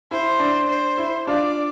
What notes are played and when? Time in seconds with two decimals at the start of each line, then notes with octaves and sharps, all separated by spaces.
0.11 E4 C5
0.39 D4
0.69 C5
0.98 E4
1.27 D4 F4 D5